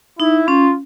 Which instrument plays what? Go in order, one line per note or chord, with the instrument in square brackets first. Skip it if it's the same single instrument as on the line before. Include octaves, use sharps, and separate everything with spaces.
[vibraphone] D#4 [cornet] E4
[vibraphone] C#4 [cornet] F4